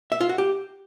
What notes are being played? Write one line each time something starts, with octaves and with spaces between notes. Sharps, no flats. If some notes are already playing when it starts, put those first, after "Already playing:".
E5
F4
F#4
G4